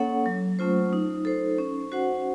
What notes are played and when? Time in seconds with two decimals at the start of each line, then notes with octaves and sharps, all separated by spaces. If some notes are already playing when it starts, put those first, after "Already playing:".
Already playing: A#3 C#4 A4 C#5 F#5
0.26 F#3
0.59 A3 C#4 F4 C5
0.93 D#4
1.25 A4 C5
1.58 C#4
1.92 F#4 C5 F#5